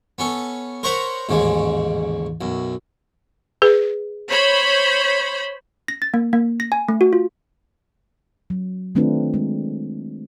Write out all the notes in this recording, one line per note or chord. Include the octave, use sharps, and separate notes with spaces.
B3 C#4 A4
A#4 C5 C#5 F#5 A#5 B5
A1 D#2 G#2 C#3 G#3
B1 F#2
G#4 B4
C5 C#5 B5
A#6
A6
A#3
A#3
A#6
G#5
A3
F#4
F4
F#3
D#3 A3 C4 D4 F4 B4
G#3